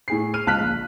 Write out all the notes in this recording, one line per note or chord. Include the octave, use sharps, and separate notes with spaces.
A2 G#4 C7
F6 D#7
C#2 A5 F6 F#6 B6
A#1